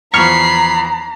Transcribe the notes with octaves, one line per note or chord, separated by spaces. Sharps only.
E2 F3 A#5 B5 C#6 F6 C7